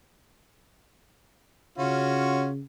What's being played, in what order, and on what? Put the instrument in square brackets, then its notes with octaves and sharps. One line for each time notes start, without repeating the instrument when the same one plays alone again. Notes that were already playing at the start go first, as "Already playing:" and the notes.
[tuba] C#3 [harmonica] C#4 F4 F#4